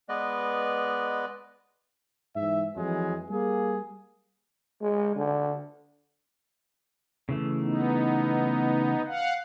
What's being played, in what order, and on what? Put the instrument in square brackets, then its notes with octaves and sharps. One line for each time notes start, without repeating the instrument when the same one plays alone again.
[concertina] G#3 B3 B4 D5 D#5
[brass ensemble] G#2 E3 E5
F2 E3 F#3 G#3
G3 A#3 G#4
[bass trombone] G#3
D3
[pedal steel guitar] C#3 E3 A3
[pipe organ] B3 D#4
F5 F#5